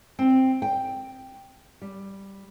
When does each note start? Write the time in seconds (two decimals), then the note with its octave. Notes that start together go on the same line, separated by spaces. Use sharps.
0.19 C4
0.62 G5
1.82 G3